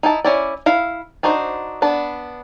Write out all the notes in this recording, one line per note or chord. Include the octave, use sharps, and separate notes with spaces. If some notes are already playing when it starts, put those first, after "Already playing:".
D#4 E4 A5
C#4 E4 D5
E4 F5
D4 D#4 F#4 C5
B3 D4 A5